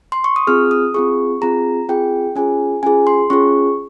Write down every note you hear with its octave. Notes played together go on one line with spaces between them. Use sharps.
C6
C#6
D#6
C4 F4 G#4 F6
D#6
C4 F4 G#4 C#6
C4 F4 G#4 A#5
C4 F4 G#4 G5
C#4 F4 G#4 G#5
C#4 F4 G#4 G#5
C6
C#4 F4 G#4 C#6